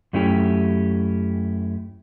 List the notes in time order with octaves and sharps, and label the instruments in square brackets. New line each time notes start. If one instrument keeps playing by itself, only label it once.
[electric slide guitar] F#2 A3 C#4 E4 G4